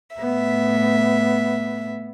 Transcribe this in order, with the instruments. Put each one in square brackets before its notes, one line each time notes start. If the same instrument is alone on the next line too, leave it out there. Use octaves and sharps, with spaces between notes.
[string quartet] A2 E5 [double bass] B3